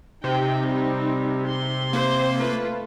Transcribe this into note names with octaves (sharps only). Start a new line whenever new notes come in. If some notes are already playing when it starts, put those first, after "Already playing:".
C3 D#4 G5
G3
C6
A#3 C5
A3 F4 B4